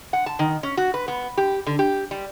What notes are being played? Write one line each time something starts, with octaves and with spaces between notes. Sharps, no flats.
F#5
A5
D#3
C#4
F#4
B4
B3
G4
D3
G4
G3